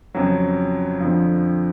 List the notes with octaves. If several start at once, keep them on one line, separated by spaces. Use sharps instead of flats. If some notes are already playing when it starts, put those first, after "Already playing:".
F2 C#3 F#3
F2 D3 F3